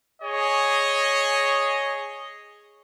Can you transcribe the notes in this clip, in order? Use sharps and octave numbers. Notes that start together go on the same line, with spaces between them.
G#4 C#5 D#5